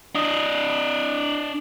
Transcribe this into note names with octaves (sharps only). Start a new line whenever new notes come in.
D4 D#5